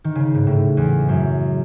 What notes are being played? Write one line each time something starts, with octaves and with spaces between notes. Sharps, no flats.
D#3
C#3
G#2
A2
E2
F#2